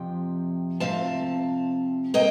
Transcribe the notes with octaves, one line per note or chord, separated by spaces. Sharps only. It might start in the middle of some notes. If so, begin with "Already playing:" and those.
Already playing: F2 C3 F3 C4 G5
C3 F3 A3 C4 F5 A5
A#3 D#5 G5